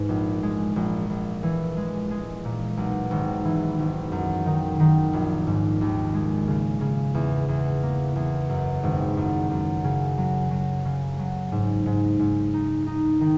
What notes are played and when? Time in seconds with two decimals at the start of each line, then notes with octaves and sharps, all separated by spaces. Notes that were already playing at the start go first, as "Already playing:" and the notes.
Already playing: G#2 E3
0.09 A#1
0.43 G#3
0.76 A#1
1.10 A#1
1.43 E3
1.77 G#3
2.11 G#3
2.45 A#2
2.77 B1
3.11 G#1
3.45 E3
3.79 G#1
4.12 F#2
4.46 D#3
4.80 D#3
5.13 A#1
5.47 G#2
5.81 D#2
6.14 G#3
6.47 C#3
6.81 C#3
7.14 E2
7.48 E2
7.83 A#3
8.16 E2
8.49 F#2
8.83 G#1
9.17 F#2
9.50 F#2
9.84 C#3
10.17 F#3
10.51 F#3
10.85 C#3
11.19 F#3
11.52 G#2
11.86 G#2
12.19 G#2
12.53 D#4
12.87 D#4
13.21 D#3